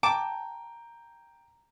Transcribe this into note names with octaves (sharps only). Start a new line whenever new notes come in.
G5 A5 A#5 D6